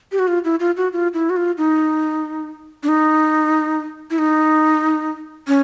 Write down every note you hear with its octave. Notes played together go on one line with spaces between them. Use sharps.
G4
F#4
F4
E4
F4
F#4
F4
E4
F#4
F4
D#4
D4
D#4
E4
D#4
C#4